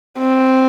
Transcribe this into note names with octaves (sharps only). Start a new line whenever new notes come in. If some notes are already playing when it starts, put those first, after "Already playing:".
C4